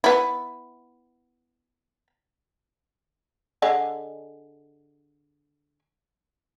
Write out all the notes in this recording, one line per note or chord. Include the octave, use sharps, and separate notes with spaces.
B3 E4
D3 G#4 D#5